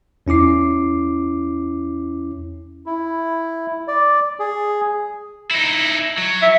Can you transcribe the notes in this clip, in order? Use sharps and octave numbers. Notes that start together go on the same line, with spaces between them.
E2 C#4 E4 D6 C7
E4
D5
G#4
D#4 E4
F#3
E5